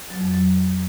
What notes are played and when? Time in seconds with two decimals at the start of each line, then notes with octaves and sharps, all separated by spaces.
0.10 F#3
0.21 F2
0.31 F#3